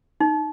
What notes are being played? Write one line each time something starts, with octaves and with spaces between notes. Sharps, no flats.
D#4